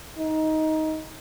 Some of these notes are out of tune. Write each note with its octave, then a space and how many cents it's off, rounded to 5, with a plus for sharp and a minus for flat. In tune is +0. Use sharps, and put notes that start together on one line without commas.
D#4 +15